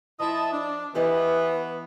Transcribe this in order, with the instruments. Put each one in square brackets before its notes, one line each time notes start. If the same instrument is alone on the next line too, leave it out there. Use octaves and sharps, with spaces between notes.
[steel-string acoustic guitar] F3 [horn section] E4 D#5 A5
[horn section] D4
[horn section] E3 B3 [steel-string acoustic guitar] G4 B4 D#5